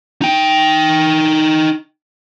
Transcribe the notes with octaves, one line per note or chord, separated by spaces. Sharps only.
D#4 G5